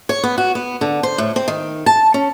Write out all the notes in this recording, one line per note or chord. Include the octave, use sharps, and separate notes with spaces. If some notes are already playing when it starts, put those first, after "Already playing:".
C#5
B3
F#4
B3
D3
C5
A2
C4
D#3
A5
C#4